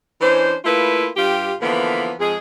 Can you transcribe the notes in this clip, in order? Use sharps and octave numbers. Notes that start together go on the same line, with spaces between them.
E3 C#4 D4 C5
A3 A#3 E4 F4 B4
G2 F4 G4
D3 E3 F3 A#3 B3
F2 G#3 G#4